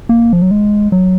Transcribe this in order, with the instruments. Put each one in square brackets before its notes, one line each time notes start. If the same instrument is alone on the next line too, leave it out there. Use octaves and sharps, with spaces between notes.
[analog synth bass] A#3
F3
F#3
G#3
F#3